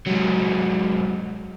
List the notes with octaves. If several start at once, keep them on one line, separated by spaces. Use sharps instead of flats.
G#2 F#3